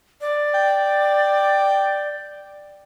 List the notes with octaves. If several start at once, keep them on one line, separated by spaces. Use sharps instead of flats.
D5
G5